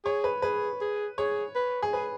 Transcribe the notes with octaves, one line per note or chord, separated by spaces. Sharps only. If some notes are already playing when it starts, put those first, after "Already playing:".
G#4 C#5
B4
G#4 B4
G#4
G#4 C#5
B4
G#4
G#4 B4